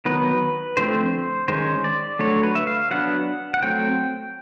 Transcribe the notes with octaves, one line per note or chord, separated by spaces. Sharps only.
D#3 F#3 B3 D#4 B4
D3 F3 A3 C4 C5
D#3 G#3 C#4 C5
D5
D3 F#3 A3 C#5
B4
E5
F5
F#3 B3 D4 F#5
F#5
F#3 A3 C4 G5